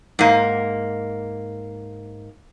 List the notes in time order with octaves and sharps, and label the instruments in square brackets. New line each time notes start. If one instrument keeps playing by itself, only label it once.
[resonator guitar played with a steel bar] G#2 A#3